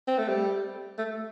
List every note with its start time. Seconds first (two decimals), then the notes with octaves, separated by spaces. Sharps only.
0.08 C4
0.18 A3
0.29 G3
0.98 A3